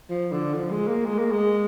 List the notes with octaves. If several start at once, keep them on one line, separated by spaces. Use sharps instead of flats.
F3
D3
F3
G#3
A#3
G#3
A#3
G#3